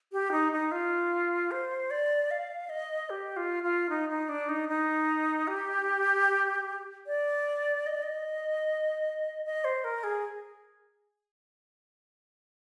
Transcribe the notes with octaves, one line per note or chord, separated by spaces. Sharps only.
G4
D#4
D#4
F4
C5
D5
F5
D#5
G4
F4
F4
D#4
D#4
D4
D#4
D#4
G4
D5
D#5
D5
D#5
D#5
C5
A#4
G#4